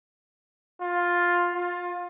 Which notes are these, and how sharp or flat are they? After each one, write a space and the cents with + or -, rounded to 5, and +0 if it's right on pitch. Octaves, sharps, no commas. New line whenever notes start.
F4 +10
F4 +25